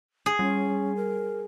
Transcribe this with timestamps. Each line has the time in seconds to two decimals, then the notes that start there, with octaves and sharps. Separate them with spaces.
0.26 G#4
0.39 G3 C#4
0.96 A#4